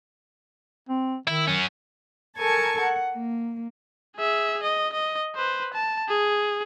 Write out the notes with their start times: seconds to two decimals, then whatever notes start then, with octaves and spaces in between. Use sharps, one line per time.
0.89 C4
1.28 D#3 E4
1.48 F#3 C#4
2.37 A4 A#4 G#5 A5 C#6 G#6
2.81 F#5
3.12 A#3
4.16 G#4 E5
4.63 D#5
4.93 D#5
5.35 B4 C5
5.74 A5
6.09 G#4